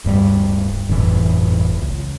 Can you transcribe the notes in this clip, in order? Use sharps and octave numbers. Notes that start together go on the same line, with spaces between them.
D1 G2 F#3 G3
G1 F2 A2 E3
C#2